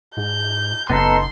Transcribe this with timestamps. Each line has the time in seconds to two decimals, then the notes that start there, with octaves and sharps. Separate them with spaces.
0.17 G#2 G6
0.90 F#1 B3 D#4 A4 C6